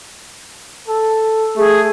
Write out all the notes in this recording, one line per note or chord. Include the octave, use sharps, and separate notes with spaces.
A4
A3 G#4